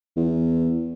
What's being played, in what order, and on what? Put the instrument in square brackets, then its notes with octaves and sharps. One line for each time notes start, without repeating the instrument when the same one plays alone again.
[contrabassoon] E2